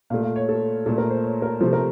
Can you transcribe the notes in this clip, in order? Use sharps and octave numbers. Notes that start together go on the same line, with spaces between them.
A#2 A3 F5
F5
C#5
A4
A#2 A3 A4
A#4
C5
C#5
A#4
C3 F3 A3 C5
A#4